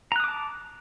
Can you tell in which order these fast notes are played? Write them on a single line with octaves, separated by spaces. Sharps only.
A#5 F#6 D#6 D6 A5